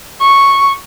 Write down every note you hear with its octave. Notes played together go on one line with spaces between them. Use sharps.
C#6